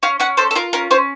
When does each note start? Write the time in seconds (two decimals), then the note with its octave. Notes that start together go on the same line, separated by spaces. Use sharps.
0.03 C#4 F5
0.20 C#4 F#5
0.37 A4 C5
0.51 A4
0.55 F4 A#4
0.73 C#4 A#4
0.91 C#4 C5